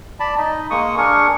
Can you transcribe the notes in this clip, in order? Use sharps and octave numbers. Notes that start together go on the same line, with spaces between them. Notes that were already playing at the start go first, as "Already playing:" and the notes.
D5 A5 B5
D#4 D#5
G#3 A#3 C#6 D#6
D4 G#4 A#4 C#6